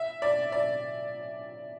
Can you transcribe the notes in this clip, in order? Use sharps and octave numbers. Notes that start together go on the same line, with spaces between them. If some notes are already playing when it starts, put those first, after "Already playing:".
Already playing: E5
D5
D5